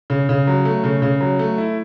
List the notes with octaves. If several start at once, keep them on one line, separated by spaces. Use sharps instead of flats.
C#3
C#3
F#3
A3
C#3
C#3
F#3
A3
E4